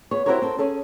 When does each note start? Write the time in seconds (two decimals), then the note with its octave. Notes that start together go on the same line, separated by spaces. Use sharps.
0.11 B3 G#4 C#5
0.26 C4 E4 F#4 G4 A#4 C#5
0.42 C4 A4 A#4
0.59 C#4 G#4 A4